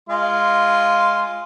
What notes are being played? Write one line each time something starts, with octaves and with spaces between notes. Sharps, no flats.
G#3 F4 C6